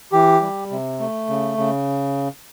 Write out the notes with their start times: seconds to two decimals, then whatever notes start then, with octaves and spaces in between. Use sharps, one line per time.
0.12 E3 G4
0.41 G3
0.71 C3
1.00 A3
1.29 C#3
1.58 C#3